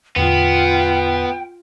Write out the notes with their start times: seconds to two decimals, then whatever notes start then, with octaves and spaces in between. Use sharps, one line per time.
0.16 E2 A2 D3 B3 F4 G5